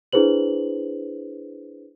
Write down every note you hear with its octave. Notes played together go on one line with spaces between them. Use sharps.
D4 E4 G#4 B4 C5 F#7